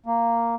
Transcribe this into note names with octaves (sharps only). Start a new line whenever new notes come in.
A#3